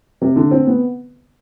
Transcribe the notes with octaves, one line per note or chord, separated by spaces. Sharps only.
C3
D3
C4
B3